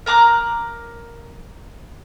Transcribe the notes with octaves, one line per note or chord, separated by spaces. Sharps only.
A#4 A#5 D6 F#6